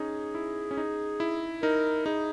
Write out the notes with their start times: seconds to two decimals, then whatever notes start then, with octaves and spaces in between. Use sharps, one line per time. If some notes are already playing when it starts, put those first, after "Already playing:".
Already playing: C#4 D#4 G#4
0.35 E4
0.71 C#4
0.77 D#4
1.20 E4
1.62 D#4 A#4
2.06 D#4 G#4